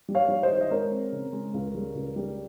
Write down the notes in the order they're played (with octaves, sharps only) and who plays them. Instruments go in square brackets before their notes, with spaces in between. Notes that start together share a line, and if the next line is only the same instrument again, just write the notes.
[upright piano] G3
C#5 F5
G3
C5 D#5
D#3
D#5
G#3 A#4 C#5
C4
C#3
G#3
C#2
G3
C#2
G3